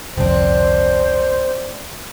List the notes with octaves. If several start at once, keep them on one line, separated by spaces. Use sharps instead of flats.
G1 C2 F2 C4 D4 C5